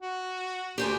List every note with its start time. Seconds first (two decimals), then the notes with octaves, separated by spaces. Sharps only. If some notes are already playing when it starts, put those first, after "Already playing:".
0.01 F#4
0.78 D2 G4 C5 G#5